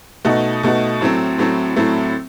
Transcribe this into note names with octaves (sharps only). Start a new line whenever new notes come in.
B2 A3 D#4 F#4
B2 A3 D#4 F#4
A2 F#3 A3 C4
A2 F#3 A3 C4
A2 F#3 A3 C4